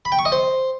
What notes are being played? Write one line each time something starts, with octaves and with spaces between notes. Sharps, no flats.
B5
G5
C#6
D#5
C5